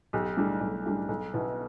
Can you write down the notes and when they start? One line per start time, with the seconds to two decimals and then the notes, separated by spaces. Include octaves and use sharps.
0.13 B1 G4
0.37 A2 G3 D4
0.61 B1
0.86 A2 G3 D4
1.09 B1
1.34 B2 B3 E4